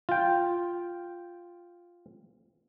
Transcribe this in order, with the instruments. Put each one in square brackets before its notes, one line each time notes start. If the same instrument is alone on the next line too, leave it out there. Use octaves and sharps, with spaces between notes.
[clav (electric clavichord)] F4 G5